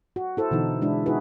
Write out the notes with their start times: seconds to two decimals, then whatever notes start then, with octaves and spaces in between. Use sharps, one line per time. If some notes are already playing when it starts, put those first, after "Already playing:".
0.16 F#4
0.37 E4 A4 C5
0.51 B2 D3 E3 D#4
0.82 G#3 D4 E4
1.06 D#4 E4 F#4 G#4 B4